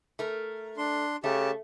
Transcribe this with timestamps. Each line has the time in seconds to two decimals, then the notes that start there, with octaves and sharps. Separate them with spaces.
0.19 A3 A#4
0.77 D4 C6
1.24 C#3 A3 G4 A5